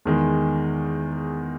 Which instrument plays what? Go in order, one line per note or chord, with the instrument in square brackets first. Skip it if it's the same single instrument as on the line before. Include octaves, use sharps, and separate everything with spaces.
[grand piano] E2 D#3 G#3